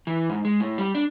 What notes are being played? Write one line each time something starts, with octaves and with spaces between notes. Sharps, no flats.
E3
G#2
G#3
A2
G3
D4